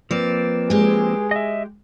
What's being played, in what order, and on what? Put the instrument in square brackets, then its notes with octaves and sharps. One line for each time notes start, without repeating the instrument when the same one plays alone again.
[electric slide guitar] F3 A#3 C4 [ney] B4 [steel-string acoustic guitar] D5
[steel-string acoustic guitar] G#3 G4 [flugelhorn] G#4
[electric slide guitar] D#5 E5